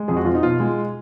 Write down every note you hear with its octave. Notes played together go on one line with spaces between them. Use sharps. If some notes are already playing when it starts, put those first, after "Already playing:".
Already playing: G#3
F2 G#4
F#4
F3 F4
D#4
B2 F4
G#3